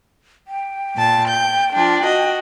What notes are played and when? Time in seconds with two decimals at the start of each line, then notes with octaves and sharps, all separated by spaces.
0.48 G5
0.95 A#2 A5
1.28 G6
1.73 F3 D4
2.04 F#4 D#5